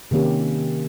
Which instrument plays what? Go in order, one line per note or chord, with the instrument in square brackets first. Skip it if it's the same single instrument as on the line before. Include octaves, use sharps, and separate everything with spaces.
[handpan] C3 D#3 A#3 C#4 G4